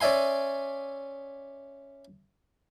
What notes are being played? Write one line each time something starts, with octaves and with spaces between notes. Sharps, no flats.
C#4 D5 E5 G#5 C6